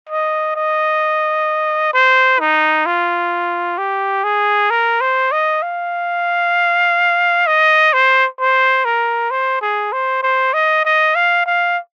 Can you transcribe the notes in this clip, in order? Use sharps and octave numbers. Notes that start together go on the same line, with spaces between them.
D#5
D#5
C5
D#4
F4
G4
G#4
A#4
C5
D#5
F5
D#5
C5
C5
A#4
C5
G#4
C5
C5
D#5
D#5
F5
F5